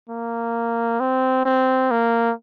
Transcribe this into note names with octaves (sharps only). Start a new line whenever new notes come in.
A#3
C4
C4
A#3